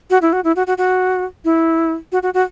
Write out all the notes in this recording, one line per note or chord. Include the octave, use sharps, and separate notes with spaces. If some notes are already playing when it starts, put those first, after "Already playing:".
F#4
E4
F#4
E4
F#4
F#4
F#4
E4
F#4
F#4
F#4